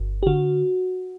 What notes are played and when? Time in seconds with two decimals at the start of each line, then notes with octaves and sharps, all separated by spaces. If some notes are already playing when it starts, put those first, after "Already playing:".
Already playing: G1
0.23 G4
0.26 D3 F#4